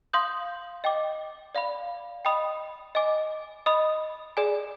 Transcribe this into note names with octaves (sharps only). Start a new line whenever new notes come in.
F5 C6 D#6 G6
D#5 G5 D6
D5 F5 B5
D#5 G5 B5 D#6
D#5 G#5 D6
D#5 B5 D#6
G#4 D5 G#5